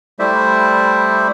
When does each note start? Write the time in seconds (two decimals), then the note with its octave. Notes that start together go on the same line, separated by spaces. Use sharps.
0.19 G3 A3 E4 C5 D5 E5